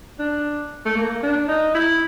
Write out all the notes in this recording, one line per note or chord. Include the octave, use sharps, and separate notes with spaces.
D4
A3
A#3
D4
D#4
E4